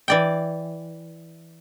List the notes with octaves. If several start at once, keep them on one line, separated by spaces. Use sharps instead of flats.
E3 D5 G5